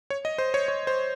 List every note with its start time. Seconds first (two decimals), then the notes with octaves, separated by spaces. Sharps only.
0.10 C#5
0.25 D#5
0.38 C5
0.54 C#5
0.68 C#5
0.87 C5